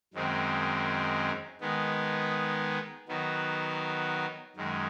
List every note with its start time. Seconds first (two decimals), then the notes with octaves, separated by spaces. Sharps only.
0.14 F#2 D#3 G#3 C4
1.61 D#3 G#3 B3
3.08 D#3 F#3 B3
4.56 F#2 D#3 G#3